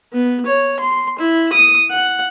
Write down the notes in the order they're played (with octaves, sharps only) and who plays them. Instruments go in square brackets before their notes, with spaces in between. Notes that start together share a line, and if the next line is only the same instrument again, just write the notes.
[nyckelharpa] B3
C#5
C6
E4
D#6
F#5